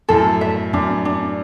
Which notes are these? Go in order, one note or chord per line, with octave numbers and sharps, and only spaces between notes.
F#2 A2 A4
E5
F#2 D4
D4